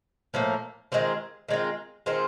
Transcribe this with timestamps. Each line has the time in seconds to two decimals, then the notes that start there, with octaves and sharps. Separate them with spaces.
0.34 A2 F3 A#3
0.92 D#3 G#3 C4 F4
1.48 D#3 G#3 C4 F4
2.06 D#3 G#3 C4 F4